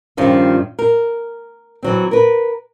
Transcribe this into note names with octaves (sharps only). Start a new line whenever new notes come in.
G2 D#3 F3 C#4 F4
A#4
E3 F#3 C4
A#4 B4